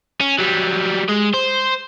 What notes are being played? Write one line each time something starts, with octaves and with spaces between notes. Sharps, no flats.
C#4
F#3 G3
G#3
C5